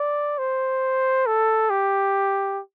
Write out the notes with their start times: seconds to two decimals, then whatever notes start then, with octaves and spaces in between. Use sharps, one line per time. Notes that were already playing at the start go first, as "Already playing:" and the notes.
Already playing: D5
0.38 C5
1.26 A4
1.70 G4